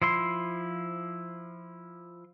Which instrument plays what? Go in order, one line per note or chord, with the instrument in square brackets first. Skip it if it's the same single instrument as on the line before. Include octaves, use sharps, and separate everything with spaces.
[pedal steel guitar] F3 E4 C6